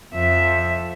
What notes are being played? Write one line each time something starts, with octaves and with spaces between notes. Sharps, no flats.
F2 E5